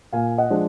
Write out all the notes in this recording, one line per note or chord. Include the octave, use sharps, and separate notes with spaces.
A#2 F5 G#5
D#5 F#5
F3 G#3 D4